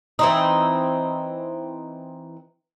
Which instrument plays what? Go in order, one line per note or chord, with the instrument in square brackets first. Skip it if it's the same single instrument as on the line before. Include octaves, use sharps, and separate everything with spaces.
[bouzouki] E3 C4 D#4